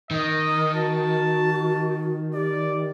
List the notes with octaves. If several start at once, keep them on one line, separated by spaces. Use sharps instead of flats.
D#3 D#5
F#4 A5
G4 D5